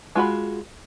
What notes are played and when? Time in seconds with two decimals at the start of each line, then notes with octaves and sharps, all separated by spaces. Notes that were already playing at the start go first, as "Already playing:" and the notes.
0.15 G#3 F4 F#4 B5